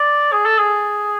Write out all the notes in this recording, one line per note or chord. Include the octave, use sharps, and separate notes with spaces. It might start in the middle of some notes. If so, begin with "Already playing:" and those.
Already playing: D5
G#4
A4
G#4